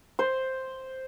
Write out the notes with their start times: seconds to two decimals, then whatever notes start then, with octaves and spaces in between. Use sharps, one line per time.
0.19 C5